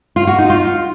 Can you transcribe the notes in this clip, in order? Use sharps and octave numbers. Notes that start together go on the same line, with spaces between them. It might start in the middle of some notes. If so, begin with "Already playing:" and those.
F4
F#4
D#4
F4